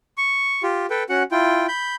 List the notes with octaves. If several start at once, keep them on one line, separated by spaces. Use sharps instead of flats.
C#6
F4 G4
A4 B4 G5
C#4 F#4 F#5
E4 F4 G5
B5 G6